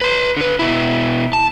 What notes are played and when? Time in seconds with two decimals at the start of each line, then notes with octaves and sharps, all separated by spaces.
0.01 B4 C6
0.37 D3 B4
0.59 B2 E4
1.33 A5